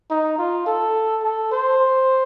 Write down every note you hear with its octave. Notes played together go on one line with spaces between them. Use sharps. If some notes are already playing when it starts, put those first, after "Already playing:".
D#4
F4
A4
A4
C5